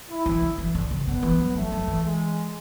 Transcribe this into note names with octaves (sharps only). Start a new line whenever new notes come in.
E4
E3
D3
E3
D3
C#3
D3 B3
E3
F#3
F#3 A3
F#3
E3
G#3